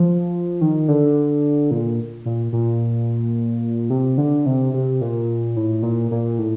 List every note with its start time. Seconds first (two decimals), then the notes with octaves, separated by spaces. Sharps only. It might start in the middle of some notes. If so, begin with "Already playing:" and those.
Already playing: F3
0.61 D#3
0.88 D3
1.71 A#2
2.25 A#2
2.52 A#2
3.90 C3
4.18 D3
4.46 C3
4.74 C3
5.01 A#2
5.56 A2
5.83 A#2
6.11 A#2
6.39 A2